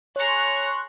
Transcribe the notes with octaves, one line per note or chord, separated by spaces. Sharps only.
G#4 C#5 A#5 C6 C#6 F#6 C#7